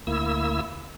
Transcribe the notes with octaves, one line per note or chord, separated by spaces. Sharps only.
D2 A#3 E4 E6